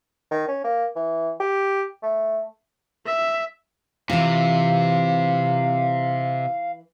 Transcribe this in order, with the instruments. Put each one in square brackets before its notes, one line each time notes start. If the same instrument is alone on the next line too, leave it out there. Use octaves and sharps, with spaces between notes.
[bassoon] D#3
C#4
A#3
E3
G4
A3
[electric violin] E5
[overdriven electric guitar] C3 [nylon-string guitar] E3 F4 [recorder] F5